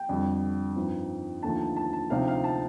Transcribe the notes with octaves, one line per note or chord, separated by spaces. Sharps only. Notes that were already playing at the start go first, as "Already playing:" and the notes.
Already playing: G5
F2 D3 G3
G2 F3 C4 D#4
D#2 D3 F3 A3 D#4 A5
A5
A5
A5
D2 C3 F3 C4 D#4 F5
F5
A5